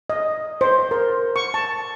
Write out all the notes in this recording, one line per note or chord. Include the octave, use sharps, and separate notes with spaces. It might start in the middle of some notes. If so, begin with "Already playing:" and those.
D#5
C5
A#4
C#6
A5